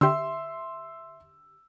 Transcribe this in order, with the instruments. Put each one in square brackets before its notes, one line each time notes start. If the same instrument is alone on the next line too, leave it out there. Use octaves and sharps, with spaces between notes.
[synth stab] D3 G4 [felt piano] E5 C6 E6